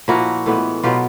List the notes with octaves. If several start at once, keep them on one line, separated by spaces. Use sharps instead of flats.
A#2 F3 A#3 E4 F#4
A2 E3 G#3 B3
B2 F#3 B3 F4 G4